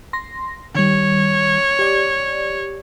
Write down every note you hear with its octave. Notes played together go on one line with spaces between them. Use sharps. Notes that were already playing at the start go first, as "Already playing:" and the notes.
C6 A#6
D#3 G3 C#5
G4 D5